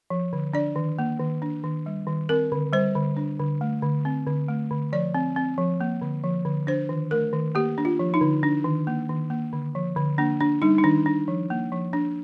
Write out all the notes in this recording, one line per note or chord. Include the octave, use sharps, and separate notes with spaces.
F3
D3
D4 D5
D#3
A#3
D#3
D4
D#3
G3
D#3
C4 A#4
D3
G3 C5
D3
D4
D3
A3
D3
C4
D3
A3
D3
F3 D5
C4
C4
F3
A#3
D3
F3
D3
D4 C5
D#3
A3 A#4
D#3
A#3 G4
D4
F4
F3
D#4
D3
D4
D#3
A#3
D#3
A#3
D3
F3
D3
A#3 D4
D4
G3 D#4
D#4
D#3 D4
D4
F3
A#3
F3
D4